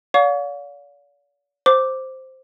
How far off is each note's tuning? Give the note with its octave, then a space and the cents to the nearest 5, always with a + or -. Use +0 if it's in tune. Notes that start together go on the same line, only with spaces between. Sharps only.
D5 -45 F5 +35 C#6 +35
C5 +0 D6 +0